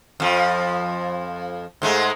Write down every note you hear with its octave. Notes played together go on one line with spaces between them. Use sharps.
F2 F3
G#2 G#3 A3